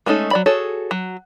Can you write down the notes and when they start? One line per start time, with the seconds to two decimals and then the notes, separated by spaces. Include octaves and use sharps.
0.06 G#3 A3 C#4 D#4 A4
0.31 F#3 D5 B5
0.46 F#4 G#4 A4 C#5
0.91 F#3